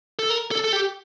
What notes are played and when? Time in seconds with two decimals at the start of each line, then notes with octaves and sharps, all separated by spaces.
0.19 A4
0.30 A#4
0.51 A4
0.64 A4
0.73 G4